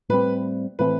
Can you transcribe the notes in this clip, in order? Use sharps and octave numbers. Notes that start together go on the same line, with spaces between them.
A2 G3 C4 B4
A2 E3 A3 C4 B4